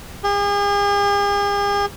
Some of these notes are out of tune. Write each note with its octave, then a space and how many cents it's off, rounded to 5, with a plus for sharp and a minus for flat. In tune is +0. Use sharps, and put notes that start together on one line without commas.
G#4 -45